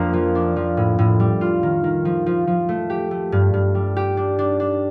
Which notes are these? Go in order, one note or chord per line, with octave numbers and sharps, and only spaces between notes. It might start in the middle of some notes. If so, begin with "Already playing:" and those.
Already playing: F2 A#3 D4 F4
F3
D4
F3
A2
A2
G3
F4
D#3
D#3
F3
F3
F3
A3
G4
A3
G2
G2
G3
G4
D4
D4
D4